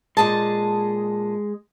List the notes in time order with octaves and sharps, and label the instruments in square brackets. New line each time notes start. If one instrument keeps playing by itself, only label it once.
[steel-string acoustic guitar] A#2 D#5 A5 [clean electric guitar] G#3